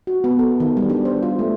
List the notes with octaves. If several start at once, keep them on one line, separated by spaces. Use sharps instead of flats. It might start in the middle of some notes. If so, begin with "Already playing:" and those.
F#4
B3
A4
D#3
G3
D4
C5
F4
A3